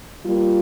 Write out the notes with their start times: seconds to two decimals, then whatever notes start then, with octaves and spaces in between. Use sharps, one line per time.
0.24 G3 A#3 F4